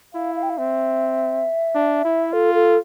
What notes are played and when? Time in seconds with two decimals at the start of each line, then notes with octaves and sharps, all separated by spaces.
0.14 E4 F5
0.36 F5
0.43 G5
0.50 F5
0.58 C4 E5
1.75 D4
2.05 E4
2.33 F4 A4
2.55 A4